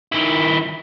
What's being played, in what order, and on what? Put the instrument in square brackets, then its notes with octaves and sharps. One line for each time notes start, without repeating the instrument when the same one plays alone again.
[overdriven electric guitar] D#3 E4